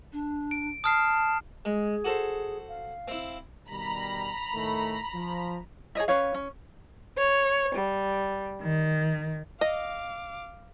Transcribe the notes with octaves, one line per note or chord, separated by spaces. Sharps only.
D4
D7
A5 D#6 F6 C7
G#3 G#4
F#4 A4 C5
F5
C4 E4
B2 D#3 G3 A#5 B5
A2 D#3 A3
F3
G#4 C#5 D#5 E5
C#4 B4 C#5 F5
C#4
C#5
G3
D#3
D#5 F5 D6